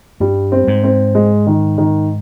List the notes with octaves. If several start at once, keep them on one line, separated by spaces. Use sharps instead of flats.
G2 G3
C4
G#2
C4
G#3
D#3
D#3